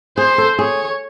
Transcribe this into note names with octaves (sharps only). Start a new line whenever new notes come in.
G#4 C5
A4
G#4 C#5